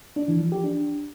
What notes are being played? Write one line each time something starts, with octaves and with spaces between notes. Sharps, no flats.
D4
E3
F3
G4
D4